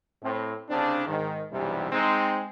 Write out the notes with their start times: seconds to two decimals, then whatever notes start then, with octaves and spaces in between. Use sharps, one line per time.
0.23 A2 C4
0.69 C2 C#3 C4 D4
1.07 G#2 D#3
1.51 B1 E2 G2 C3 E3 G3
1.92 G#3 C4 D#4